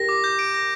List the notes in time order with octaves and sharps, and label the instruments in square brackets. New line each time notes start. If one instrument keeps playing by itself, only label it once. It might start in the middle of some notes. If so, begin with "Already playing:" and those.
Already playing: [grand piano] G4 A#4 [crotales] A#6
[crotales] D6
G6
D7
A#6